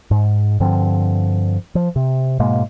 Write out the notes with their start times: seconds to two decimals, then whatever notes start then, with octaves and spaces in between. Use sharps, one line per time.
0.11 G#2
0.60 G2 D3 F3 C4
1.75 F3
1.96 C3
2.39 G#2 B2 G#3 A#3